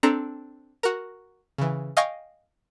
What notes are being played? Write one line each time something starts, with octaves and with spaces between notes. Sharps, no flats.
C4 D4 A4 A#5
F#4 A#4
C#3 E3
D#5 F5 G5 G#5 C#6 A#6